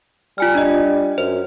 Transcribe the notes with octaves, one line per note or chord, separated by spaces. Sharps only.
G3 F4 G#5 F6
D4 D#5
F#2 C5